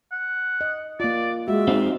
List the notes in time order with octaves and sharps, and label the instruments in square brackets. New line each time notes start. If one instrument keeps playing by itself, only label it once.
[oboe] F#5
[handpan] D#5
[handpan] A#3 F4 [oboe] D5
[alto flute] G#3 [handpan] F#4 [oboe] E5
[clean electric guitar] C4 D#4 F5